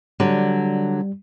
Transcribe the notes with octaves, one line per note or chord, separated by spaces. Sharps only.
D3 F#3 G3